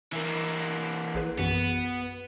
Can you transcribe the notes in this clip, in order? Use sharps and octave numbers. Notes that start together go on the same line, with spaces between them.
E3 A#3
A#1 G#4 B4
F#2 E3 B3 F#4